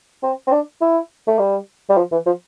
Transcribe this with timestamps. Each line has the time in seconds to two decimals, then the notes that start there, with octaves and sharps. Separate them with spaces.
0.23 C4
0.47 C4
0.51 D4
0.81 E4
1.27 A3
1.39 G3
1.89 G3
1.97 F3
2.12 E3
2.26 F3